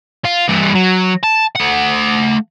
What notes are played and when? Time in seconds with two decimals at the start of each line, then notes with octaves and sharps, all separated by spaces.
0.25 F4
0.48 G2 E3
0.75 F#3
1.24 A5
1.56 A3 F#5